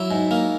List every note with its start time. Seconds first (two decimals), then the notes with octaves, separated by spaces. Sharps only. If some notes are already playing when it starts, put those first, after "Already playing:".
Already playing: F#3 E4
0.11 G#2
0.31 A#3